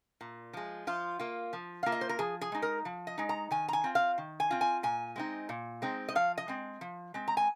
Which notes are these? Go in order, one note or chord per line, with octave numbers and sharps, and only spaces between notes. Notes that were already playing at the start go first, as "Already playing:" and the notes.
A#2
F3 G#3
F3 F4
A#3 F4
F3
A#3 F4 F5
D#5
C5
A#4
F3 G#4
G#4
G#3 D#4
A#4
F3
D#5
G#3 D#4
A#5
D#3 G#5
A#5
G#5
C4 F4
F5
D#3
G#5
C4 F4
G#5
A#2 G#5
G#3 C4 D#4
A#2
G#3 C4 D#4
D#5
F3 F5
D#5
G#3 C4
F3
G#3 C4
A#5
G#5